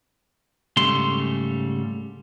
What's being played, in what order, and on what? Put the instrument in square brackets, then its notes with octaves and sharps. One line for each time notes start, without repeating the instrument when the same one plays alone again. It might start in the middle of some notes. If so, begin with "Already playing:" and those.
[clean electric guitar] G#2 C#3 G3 A3 C6